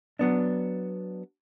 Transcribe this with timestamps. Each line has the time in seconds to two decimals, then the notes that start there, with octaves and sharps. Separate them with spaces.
0.19 F#3 B3 D4